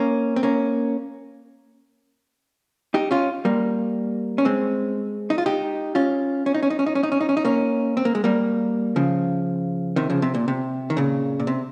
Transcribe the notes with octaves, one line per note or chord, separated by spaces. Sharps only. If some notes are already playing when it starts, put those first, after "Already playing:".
Already playing: A#3 C#4
C4
A#3 C#4
D#4 G4
C#4 F4
G3 A#3
C#4
G#3 C4
D#4
F4
D#4 G4
C#4 F4
C#4
D#4
C#4
D#4
C#4
D#4
C#4
D#4
C#4
D#4
C#4
D#4
A#3 C#4
C4
A#3
G#3
G3 A#3
C#3 F3
C3 D#3
C#3 F3
C3
A#2
C3
D#3
A#2 C#3
A#2
C3